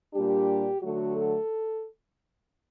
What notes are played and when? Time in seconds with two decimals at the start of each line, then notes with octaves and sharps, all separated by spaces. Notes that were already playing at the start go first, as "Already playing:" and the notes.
0.14 A#2 G3 D4 G4
0.82 D3 F#3 A3 F#4
1.16 A4